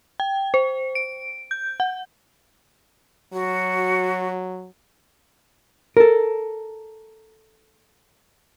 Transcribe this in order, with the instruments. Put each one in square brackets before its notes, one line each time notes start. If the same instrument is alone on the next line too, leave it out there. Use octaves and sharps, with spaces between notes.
[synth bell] G5
C5
D7
G6
F#5
[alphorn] F#3 [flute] F#4
[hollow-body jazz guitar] A4 A#4